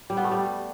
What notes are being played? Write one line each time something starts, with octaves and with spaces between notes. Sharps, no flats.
G3
B3
A3
G3